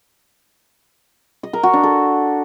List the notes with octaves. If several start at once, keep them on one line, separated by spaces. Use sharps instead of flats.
D#5
A#4
F#4
D4
A4